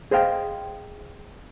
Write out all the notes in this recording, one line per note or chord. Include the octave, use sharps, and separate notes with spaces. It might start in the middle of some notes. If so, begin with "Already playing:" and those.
G#4 C5 D#5 F5 G5